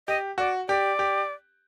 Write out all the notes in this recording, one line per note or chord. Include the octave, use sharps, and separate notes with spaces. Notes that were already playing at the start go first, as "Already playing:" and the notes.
G4 D#5
F#4 D5
G4 D5
G4